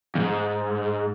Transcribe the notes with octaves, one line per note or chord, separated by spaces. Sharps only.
E2 G#2